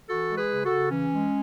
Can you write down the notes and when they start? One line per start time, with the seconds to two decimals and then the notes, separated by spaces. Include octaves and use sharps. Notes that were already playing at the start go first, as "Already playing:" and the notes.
0.09 E3 F#4 A4
0.29 G#3
0.36 G#4 B4
0.51 C#3
0.64 F#4 A4
0.71 C#3
0.91 E3 C#4
1.12 G#3